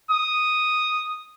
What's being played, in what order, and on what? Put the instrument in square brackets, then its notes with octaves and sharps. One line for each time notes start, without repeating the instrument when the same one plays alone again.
[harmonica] D#6